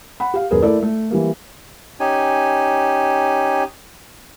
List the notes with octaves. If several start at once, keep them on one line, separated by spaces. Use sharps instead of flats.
F#5 B5
G4 F5
D#1 F#2 G#4 A#4 B4
A3 E4 A4 A#4 D5
A3
E3 G3 A#3
C#4 D#4 G4 G#5